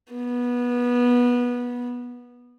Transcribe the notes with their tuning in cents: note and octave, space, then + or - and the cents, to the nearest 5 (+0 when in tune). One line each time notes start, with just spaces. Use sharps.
B3 -20